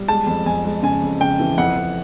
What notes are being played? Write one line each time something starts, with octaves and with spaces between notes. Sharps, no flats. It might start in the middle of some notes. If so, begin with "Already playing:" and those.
Already playing: G3
G#3 A5
F2
F2 G#5
G#3
C#3 G#5
F2
C#3 G5
E3
F2 F#5
F2